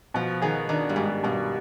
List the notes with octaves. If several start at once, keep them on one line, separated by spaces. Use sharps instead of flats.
B2 F3
D#3 G#4
D#3 D4
G2
G#2 G3
G2 B2